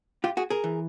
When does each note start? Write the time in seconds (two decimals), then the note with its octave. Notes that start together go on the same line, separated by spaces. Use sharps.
0.24 F4 G4
0.37 F#4 G#4
0.50 G#4 A#4
0.64 E3